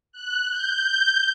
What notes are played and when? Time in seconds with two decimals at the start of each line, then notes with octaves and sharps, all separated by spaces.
0.12 F#6
0.49 G6